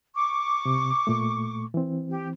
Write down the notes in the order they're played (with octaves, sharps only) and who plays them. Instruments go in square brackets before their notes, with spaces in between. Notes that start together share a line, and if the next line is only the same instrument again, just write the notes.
[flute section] C#6 D6
[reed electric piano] C3
A#2 A3
E3 C4
[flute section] G4